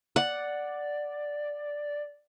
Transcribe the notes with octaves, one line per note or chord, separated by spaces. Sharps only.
D5 F#5